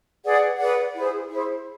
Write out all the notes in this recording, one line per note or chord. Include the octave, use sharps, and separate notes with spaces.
G#4 B4 D5 F#5
G#4 B4 D5 F#5
E4 G#4 C5
E4 G#4 C5